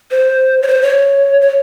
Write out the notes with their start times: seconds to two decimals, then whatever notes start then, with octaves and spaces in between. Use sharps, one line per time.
0.11 C5
0.62 C#5
0.68 C5
0.82 C#5
1.41 C#5